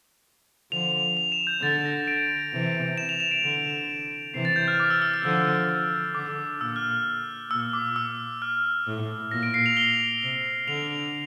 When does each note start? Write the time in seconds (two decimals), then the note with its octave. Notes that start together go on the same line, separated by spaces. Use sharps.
0.72 D3 F3 F7
1.17 F7
1.32 E7
1.47 G6
1.62 D3 A6
1.85 A#6
2.08 D7
2.53 C3 E3
2.98 E7
3.09 F7
3.20 E7
3.31 D7
3.43 D3
4.34 C3 E3 C7
4.45 A6
4.56 G6
4.68 F6
4.80 D6
4.90 E6
5.02 E6
5.14 E6
5.24 D3 F3
6.15 D3 D6
6.60 A#2 E6
6.76 F6
6.91 E6
7.51 A#2 E6
7.73 D6
7.96 E6
8.42 F6
8.87 A2
9.31 A#2 A#6
9.43 D7
9.54 C7
9.66 F7
9.77 G7
10.23 C3
10.68 D3 F7